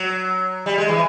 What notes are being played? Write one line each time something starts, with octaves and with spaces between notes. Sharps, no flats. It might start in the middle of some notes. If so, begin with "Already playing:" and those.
Already playing: F#3
G3
G#3
E3